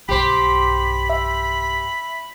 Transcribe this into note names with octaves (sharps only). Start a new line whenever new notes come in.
B1 G2 G4 C5 B5
E5